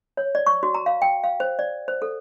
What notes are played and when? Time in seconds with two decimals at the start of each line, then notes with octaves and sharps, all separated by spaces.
0.17 C#5
0.35 D5
0.46 C#6
0.63 F#4
0.74 A#5
0.86 F5
1.02 G5
1.24 F5
1.40 C5
1.59 D5
1.88 C5
2.02 A4